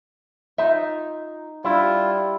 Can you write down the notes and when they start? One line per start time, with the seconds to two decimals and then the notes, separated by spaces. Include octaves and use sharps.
0.58 D#4 F4 E5
1.65 G3 D4 E4 F4